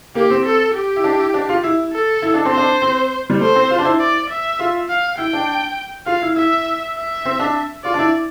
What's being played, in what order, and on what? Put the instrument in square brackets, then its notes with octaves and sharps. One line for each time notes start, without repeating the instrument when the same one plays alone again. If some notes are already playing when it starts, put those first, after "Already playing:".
[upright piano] A#3 [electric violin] G4
[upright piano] C4
[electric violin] A4
G4
[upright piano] E4
D4
E4
D4
F4
E4
[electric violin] A4
[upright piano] E4
D4
C4
[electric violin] C5
[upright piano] D4
C4
G3
[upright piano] A3 [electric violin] C5
[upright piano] C4
F4
D4
E4
[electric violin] D5
E5
[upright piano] F4
[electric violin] F5
[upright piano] E4 [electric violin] G5
[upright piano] D4
[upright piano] F4 [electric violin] F5
[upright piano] E4
[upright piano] E4 [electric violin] E5
[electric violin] E5
[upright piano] C4
D4
[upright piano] F4 [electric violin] D5
[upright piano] D4
E4